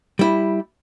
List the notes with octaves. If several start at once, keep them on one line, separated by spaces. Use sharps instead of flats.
G3 E4